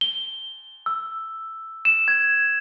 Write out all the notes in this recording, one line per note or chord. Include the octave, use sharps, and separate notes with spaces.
G7
E6
E7
G#6